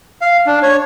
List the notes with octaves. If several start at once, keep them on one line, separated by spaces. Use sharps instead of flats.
F5
D4
C#5